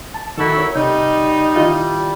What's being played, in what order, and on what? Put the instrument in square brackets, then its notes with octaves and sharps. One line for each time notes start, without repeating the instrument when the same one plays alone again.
[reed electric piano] A5
[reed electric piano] D#3 A#5 [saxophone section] E4 F#4 A4
[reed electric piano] A#4 C#5 C#6
[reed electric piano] C3 [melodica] G3 [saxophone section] D#4
[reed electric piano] D#3 E4 F4